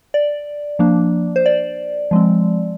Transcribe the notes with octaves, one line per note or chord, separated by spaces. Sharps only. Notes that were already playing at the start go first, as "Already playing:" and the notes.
D5
F3 A#3 D4
C5
D5
F3 G#3 C4